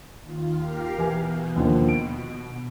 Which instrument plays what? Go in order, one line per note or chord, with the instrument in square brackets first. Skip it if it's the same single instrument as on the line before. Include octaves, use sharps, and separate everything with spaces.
[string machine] D#2 F4
G4 A#4 F5
[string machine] B2 [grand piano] E3 G#5
[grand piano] D#2 D3 F3
D7